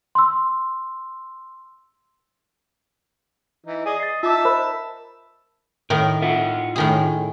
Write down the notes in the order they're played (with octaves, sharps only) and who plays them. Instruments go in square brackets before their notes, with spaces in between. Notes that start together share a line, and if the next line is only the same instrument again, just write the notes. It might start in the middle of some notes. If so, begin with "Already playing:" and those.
[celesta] C6 E6
[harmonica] E3 D#4
G#4 D5 D#5
[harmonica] D#5 [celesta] A6 C7
[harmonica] D#4 E5 A5 [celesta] F4 D6
[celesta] A#4 C5 B5
[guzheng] A2 D#3 D#4 [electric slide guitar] A#4
[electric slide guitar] F4 E5 F#5
[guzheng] A2 D#3 G#4